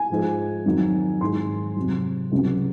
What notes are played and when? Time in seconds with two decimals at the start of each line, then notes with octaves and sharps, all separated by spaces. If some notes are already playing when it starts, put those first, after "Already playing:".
Already playing: G#5
0.10 G#2 F3 G#3
0.65 F2 D#3 F#3
1.21 G#2 D#3 G#3 C6
1.76 F2 C3 F#3
2.32 C#2 C3 F#3